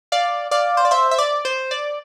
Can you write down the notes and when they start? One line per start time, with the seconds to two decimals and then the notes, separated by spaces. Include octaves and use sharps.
0.12 D5 F5
0.51 D5 F5
0.77 C5
0.85 D5
0.91 C5 E5
1.11 E5
1.18 D5
1.45 C5
1.71 D5